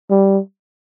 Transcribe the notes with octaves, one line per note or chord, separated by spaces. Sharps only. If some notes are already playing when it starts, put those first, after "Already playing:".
G3